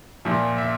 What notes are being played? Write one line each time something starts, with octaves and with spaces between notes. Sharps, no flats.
A#2 F3 E5
E5